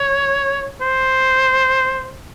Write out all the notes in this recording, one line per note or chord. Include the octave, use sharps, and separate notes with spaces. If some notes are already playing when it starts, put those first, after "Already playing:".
Already playing: C#5
C5